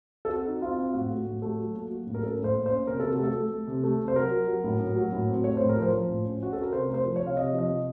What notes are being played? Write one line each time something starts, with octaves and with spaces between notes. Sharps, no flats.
A4
C4 F#4
D#4
C4 F4
C4
F4
A2 F#4
A3
A2
A3
F#3
A#3
F#3
A2
A#4
C#4 A4
A2
C5
A#3
C5
C#4
C3 A#4
C3 A4
F#4
A3 A4
A3
A3
C3
A3
C3
C5
F#3 A#4
F#3
F#3
A2
A2
F#3
A2
C4
A3 C#5
A2 C5
A#4
F3
C5
F3
A2
C#4
C#4 F#4
C#4 A4
A#4
C3 C5
A#4
A3
C5
F3
C#5
C3
F5
C3 D#5
F3
D#5
C3